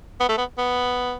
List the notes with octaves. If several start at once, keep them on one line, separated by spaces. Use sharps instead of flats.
B3
A3
B3
B3